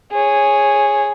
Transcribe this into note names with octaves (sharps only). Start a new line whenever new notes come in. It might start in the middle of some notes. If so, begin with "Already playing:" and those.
G#4 C#5